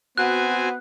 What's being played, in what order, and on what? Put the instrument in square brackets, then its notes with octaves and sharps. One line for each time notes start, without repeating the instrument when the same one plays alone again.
[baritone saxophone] B3 [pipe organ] C4 G#5 [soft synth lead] F#4 [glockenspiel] F#6